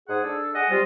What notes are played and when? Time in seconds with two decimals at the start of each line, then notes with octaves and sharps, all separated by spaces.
0.08 G#2 G#4 F#5
0.23 D4 A4
0.55 G#4 D#5 F#5
0.70 G3 C4 F4